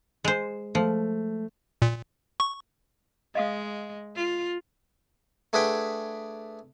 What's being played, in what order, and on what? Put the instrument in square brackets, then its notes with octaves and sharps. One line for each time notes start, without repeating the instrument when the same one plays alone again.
[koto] G#3 C5
[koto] F3 [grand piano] A3
[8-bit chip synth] A#2
C#6
[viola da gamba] G#3 [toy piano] D#5 F5 D#6
[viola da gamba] F4
[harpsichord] A3 D4 G#4 B4 F#5 G5